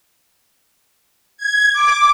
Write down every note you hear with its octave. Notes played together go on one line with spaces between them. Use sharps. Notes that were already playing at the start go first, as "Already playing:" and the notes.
G#6
D6